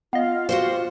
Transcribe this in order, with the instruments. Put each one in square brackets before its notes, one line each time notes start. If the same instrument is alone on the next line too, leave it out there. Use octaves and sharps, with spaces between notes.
[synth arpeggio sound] B3 D#5 [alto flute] F4 [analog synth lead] F5
[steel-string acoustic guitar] F#4 G4 C5